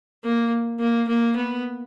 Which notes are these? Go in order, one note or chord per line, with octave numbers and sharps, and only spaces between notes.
A#3
A#3
A#3
B3